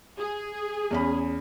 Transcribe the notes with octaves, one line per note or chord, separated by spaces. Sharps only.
G#4
E2 C#4 B5